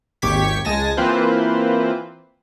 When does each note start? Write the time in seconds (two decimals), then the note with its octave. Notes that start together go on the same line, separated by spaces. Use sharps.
0.22 G#1 D#2 G4 C#6 G#6 B6
0.65 C#2 G#3 G#5 A5 A#6
0.97 E3 A#3 C4 F4 B4 C5